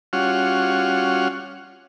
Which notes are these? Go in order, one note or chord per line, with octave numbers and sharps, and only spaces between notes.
G3 C#4 F4 F#4 F#5 F6